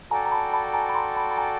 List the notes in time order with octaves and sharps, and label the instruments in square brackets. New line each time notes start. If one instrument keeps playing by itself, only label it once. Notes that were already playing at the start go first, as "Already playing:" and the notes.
[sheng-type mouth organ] F#4 A4 D5 G5 [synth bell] G#5 A#5
[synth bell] A#5
A5 B5
A5 B5
G#5 A#5
B5
A#5 C6
A5 B5
B5
G#5 A#5